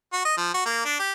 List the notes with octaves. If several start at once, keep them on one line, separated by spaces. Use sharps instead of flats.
F#4
D#5
F3
F#4
A#3
D4
G4